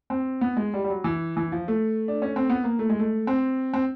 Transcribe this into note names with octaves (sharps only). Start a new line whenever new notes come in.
C4
B3
G#3
G3
G3
F#3
E3
E3
F3
A3
D4
C#4
C4
B3
A#3
A3
G#3
A3
C4
C4